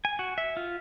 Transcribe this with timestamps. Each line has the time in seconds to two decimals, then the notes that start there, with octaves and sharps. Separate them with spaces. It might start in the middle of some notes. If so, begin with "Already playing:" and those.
0.05 G#5
0.19 F#4
0.38 E5
0.57 F4